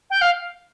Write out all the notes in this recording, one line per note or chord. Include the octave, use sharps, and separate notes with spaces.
G5
F5